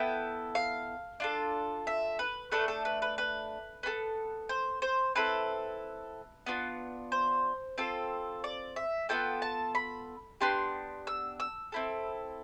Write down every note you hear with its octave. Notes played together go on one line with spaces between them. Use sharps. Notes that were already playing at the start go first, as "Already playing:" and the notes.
Already playing: B3 E4 A4 G5
F5
D4 F4 A4
E5
B4
A3 D4 A4 B4
A4
B4
B4
B4
B3 D4 A4
C5
C5
C4 E4 A4 B4
B3 D4 F4
C5
C4 F4 A4
D5
E5
B3 D4 F4 A4 G5
A5
B5
B3 D4 G4 C6
E6
E6
C4 E4 A4